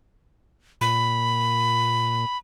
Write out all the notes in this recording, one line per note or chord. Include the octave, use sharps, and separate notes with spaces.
A#2 B5